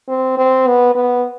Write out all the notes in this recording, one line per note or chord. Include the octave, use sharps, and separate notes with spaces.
C4
C4
B3
B3